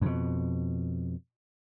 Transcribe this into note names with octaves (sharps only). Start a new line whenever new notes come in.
F2 B2